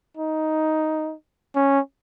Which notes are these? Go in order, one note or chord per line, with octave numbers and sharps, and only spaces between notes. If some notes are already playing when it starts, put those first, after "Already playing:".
D#4
C#4